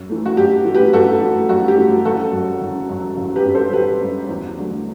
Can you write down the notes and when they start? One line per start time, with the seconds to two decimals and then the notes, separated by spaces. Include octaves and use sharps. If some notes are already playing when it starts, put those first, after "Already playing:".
Already playing: F#2
0.09 E3 A3
0.26 F#4
0.37 F#2 G4
0.65 E3 A3
0.75 G4 B4
0.93 F#2 F#4 A4
1.21 E3 A3
1.49 F#2 F#4
1.68 G4
1.77 E3 A3
2.05 F#1 F#4 A4
2.33 F#2 F#3
2.61 F#1
2.89 F#2 F#3
3.17 F#1
3.36 G4 B4
3.45 F#2 F#3
3.55 A4 C5
3.73 F#1 G4 B4
4.01 F#2 F#3
4.29 E2
4.57 D3 F#3 A3